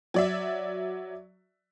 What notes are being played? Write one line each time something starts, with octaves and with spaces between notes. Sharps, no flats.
F#3 D5 E5